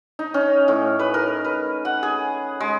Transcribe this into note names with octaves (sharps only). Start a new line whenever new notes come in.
D#4
C#4
A2
B4
A#4
B4
F#5
G#4
G#3